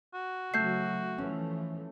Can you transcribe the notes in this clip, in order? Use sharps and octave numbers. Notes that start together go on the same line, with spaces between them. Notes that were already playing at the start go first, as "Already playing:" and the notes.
F#4
C#3 F#3 A3 E5 G6 C7
E3 F3 A3 C#4